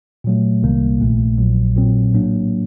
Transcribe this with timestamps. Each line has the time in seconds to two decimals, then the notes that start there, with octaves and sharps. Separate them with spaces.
0.24 A#2 F#3 A3
0.63 C2 C3 D#3 G3 A#3
1.01 A#1 A#2 A3
1.38 A#1 A#2 F#3
1.76 A#2 F#3 C4
2.14 A2 F#3 A#3 D4